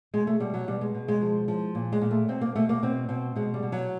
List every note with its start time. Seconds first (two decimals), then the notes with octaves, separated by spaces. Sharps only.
0.14 B2 G#3
0.27 A3
0.40 B2 G3
0.54 F#3
0.67 B2 G3
0.81 G#3
0.94 B2
1.08 G#3
1.21 F3
1.48 F3
1.75 A#2
1.92 G#3
2.01 A#2
2.11 A3
2.28 B2 C4
2.41 A#3
2.56 B2 A3
2.69 A#3
2.83 B2 C4
3.09 B2 C4
3.36 B2 G#3
3.54 G3
3.62 B2
3.72 F#3